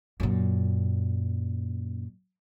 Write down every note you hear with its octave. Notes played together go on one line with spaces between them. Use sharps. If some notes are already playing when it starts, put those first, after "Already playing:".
F#2 A#2